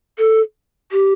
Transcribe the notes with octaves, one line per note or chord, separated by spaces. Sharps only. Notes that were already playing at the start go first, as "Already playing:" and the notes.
A4
G4